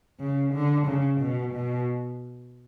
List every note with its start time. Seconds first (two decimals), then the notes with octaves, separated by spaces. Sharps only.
0.20 C#3
0.54 D3
0.86 C#3
1.21 B2
1.54 B2